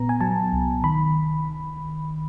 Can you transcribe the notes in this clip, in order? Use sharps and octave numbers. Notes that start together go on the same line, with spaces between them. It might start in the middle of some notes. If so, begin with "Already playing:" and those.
Already playing: A#2 B3 A#5
G#5
F#3 A5
C2
D#3 B5